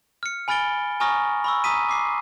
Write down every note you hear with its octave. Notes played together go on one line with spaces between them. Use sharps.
F6 C#7
G#5 B5 F6 A6 D7 G7
G#5 A#5 C#6 D#6 F6 A#6
B5 C#6 E6
A#5 D#6 B6 D#7
D6 C7